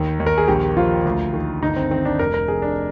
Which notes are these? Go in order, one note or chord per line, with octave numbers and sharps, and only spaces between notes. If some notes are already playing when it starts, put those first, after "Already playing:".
Already playing: D#2 D#3
D#2
A#4
G#4
A#1 G4
F3 F4
D2
D#3
G1 D#4
C4
D#3 C4
D4
F1 A#4
A#4
F1 G#4
D4